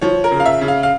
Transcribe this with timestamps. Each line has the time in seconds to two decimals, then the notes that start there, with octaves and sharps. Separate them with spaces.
0.01 F3 C#5
0.24 A#4
0.31 C#3
0.40 F5
0.45 E5
0.61 C#3
0.68 F5
0.83 F5